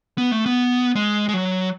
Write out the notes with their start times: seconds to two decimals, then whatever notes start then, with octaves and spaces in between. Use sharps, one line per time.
0.18 B3
0.32 A3
0.46 B3
0.95 G#3
1.29 G#3
1.34 F#3